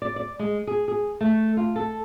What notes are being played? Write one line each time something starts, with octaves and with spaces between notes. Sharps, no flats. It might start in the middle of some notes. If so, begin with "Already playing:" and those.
D5
D5
G#3
G#4
G#4
A3
F4
A4